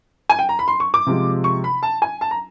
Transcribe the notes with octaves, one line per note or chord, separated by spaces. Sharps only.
G#5
G5
A#5
B5
C6
C#6
D6
C3 F3 G#3
C#6
B5
A5
G#5
A5
A#5